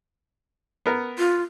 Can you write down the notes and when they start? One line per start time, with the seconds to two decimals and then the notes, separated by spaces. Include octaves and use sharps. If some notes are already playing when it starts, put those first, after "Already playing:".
0.86 B3 A#4
1.18 F4